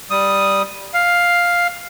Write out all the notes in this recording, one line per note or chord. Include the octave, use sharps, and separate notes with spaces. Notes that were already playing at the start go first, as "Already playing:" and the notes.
G3 D#6
F5